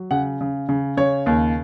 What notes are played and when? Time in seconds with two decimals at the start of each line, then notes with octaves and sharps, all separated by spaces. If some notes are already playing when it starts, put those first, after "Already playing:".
Already playing: F#3
0.11 C#3 F#5
0.41 C#3
0.69 C#3
0.97 C#3 C#5
1.26 D#2